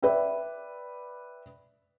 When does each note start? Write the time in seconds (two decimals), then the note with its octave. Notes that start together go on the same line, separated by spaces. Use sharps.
0.02 B4 D5 E5 G5